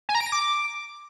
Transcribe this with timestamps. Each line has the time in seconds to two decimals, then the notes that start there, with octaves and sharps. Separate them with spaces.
0.09 G#5
0.15 A#5
0.21 D7
0.26 A#6
0.32 D6